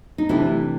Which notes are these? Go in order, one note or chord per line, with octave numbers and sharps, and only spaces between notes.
D#4
C3 E3 A3 D4 E4